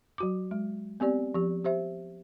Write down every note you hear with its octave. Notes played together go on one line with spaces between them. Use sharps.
F#3 F#4 D6
G#3
B3 C4 G4 D5
F3 G4
G4 C5 E5